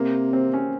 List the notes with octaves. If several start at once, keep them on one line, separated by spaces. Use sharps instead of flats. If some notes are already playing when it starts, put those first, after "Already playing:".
Already playing: C3 A#3
C4
C#4